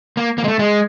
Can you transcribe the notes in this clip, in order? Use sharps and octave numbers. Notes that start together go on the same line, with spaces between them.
A#3
A#3
G#3
A3
G#3